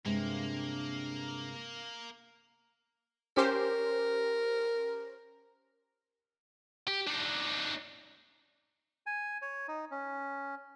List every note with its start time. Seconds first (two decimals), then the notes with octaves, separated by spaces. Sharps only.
0.05 G2 C3 G#3 A#3 D4
3.37 C#4 G4 A#4 C5
6.87 G4
7.07 D4 D#4
9.06 G#5
9.42 C#5
9.68 D#4
9.91 C#4